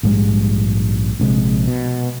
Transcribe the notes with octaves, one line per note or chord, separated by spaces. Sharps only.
A#1 G#2 G3 G#3
A#1 C3 G#3
B2